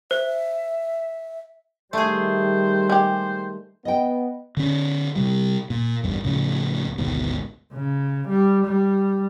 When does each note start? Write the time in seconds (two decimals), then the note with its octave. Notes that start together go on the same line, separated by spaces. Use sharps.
0.11 C5 E5
1.93 D#3 G3 A3 G#4 C5
2.90 G#3 G4 C5
3.85 B3 D#5 G5
4.57 D3 C#4
5.16 C3 G3
5.70 A#2
6.03 A1 E2 G2
6.24 C#2 A2 C#3 F3
6.98 G#1 D2 G#2 B2
7.72 C#3
8.29 G3
8.66 G3